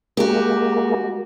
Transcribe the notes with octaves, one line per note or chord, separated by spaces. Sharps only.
G#3 A#3 F#4 G4